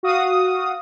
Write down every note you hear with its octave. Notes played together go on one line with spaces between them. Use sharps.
F#4 F5 D#6